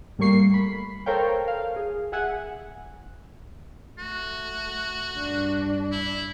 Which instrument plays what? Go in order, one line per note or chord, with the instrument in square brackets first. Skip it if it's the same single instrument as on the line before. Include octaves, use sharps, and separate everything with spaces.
[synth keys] A2 G3 A3 A#3 C#6 C7
B5
A4 A#4 C5 C#5 F5 G5
F5
G#4
G#4 E5 F#5 G#5
[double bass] A3 [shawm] F#4
[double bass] G2 D4
[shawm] E4